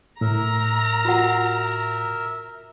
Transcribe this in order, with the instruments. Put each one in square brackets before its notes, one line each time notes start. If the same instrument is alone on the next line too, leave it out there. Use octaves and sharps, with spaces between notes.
[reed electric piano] A2 [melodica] A#4 E5 [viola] A#5
[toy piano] F4 F#4 F#5